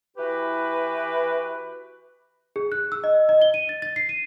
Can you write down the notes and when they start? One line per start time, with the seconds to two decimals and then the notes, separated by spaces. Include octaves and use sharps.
0.17 E3 E4 F#4 G4 B4
2.56 G#4
2.72 F#6
2.92 E6
3.04 D#5
3.29 D#5
3.42 G7
3.54 D#7
3.69 A6
3.82 A6
3.96 C7
4.09 D#7